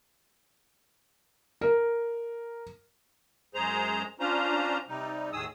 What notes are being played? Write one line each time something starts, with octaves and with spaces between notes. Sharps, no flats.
A#4
F#2 G#3 G#4 C5 A#5
C#4 D4 F4 C5 A#5
C3 G3 D#4
D#2 A2 D#3 G#4 D#6 E6